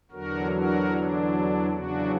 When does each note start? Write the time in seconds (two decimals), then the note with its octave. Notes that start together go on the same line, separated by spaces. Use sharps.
0.11 E2 D3 F#3 F#4 A#4
0.51 F#4 A#4
0.91 D4
1.70 E2 C#3 F#3 D4 F#4